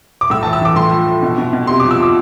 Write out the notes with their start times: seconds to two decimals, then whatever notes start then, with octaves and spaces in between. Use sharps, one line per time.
0.21 D6
0.30 A2 E6
0.43 E3 A5
0.53 E6
0.61 E3 D6
0.76 A2 C6
0.91 F3
1.07 F3
1.22 B2
1.38 B2
1.53 B2
1.67 C3 C6
1.80 D6
1.84 F3
1.91 E6
1.99 F3 D6